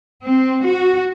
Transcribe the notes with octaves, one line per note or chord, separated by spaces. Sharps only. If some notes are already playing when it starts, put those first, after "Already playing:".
C4
F#4